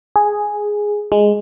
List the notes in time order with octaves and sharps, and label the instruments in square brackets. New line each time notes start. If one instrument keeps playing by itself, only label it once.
[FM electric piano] G#4
G#3